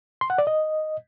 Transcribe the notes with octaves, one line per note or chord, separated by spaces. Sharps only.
C6
F#5
D5
D#5